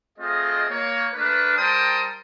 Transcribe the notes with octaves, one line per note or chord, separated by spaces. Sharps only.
A3 C4 F4 G#4 D#5
A#3 C#5
A3 D4 A#4 B4
G3 A#4 C5 G5 A5 D#6